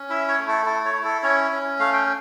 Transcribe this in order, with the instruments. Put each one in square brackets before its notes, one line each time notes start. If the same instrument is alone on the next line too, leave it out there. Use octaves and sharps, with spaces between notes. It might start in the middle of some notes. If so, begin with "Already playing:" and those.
Already playing: [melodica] C#4
E4 E5
C#5
A3
A4
E4 A4
C#5
E4
A4
C#4 C#5
C#4
A3 F5
G5